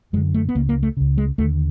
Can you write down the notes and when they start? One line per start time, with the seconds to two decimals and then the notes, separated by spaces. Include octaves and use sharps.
0.13 F#2 G#3
0.17 D3
0.34 A3
0.49 B3
0.55 C#2 C#3 A#3
0.69 A#3
0.83 A3
0.97 C#2 C#3
1.18 G#3
1.38 D#2 A3
1.41 D3